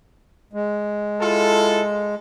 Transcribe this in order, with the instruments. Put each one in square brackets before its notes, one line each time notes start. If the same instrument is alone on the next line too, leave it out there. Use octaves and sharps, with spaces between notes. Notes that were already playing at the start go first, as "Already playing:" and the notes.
[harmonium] G#3
[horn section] E4 F4 A4